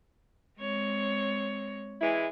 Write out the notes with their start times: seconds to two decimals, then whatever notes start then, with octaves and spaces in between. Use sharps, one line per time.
0.60 G#3 C4 C#5
2.01 E3 G#3 E4